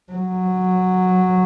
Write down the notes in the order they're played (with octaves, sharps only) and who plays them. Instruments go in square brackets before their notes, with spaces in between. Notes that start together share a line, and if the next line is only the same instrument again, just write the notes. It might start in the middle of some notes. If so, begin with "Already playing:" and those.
[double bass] F#3